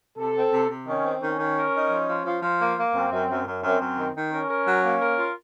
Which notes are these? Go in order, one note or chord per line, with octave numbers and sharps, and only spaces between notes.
C3 A4
C4
C3
C3
D#3 C#4
C4
D#3 C#4
D#3
A#4
D#4
F3
F3
F3
F3
A#3
A#3
F#2 C4
F#2
F#2
F#2
F#2 C4
F#2
D#3
D#3
C#4 A#4
A#4
F#3
A#3
A#4
F4